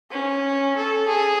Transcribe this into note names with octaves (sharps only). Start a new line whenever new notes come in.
C#4
A4
G#4